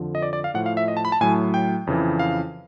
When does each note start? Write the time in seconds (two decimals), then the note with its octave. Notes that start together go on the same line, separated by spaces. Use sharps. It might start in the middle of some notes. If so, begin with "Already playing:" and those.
Already playing: F2 D3 F3
0.15 D#5
0.22 D5
0.33 D5
0.44 F5
0.54 A2 F3 F#5
0.66 F5
0.77 E5
0.88 D#5
0.97 A5
1.05 B5
1.12 A5
1.21 A2 F#3 G#5
1.54 G5
1.87 F2 C#3 E3
2.19 F5